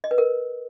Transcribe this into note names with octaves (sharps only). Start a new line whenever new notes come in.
D#5
B4
A#4